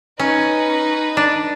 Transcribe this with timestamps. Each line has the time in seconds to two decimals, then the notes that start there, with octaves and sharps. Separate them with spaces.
0.19 C#4 D#4 B4
1.17 D4